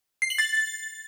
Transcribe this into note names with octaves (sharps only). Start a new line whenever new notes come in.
C7
F#7
A6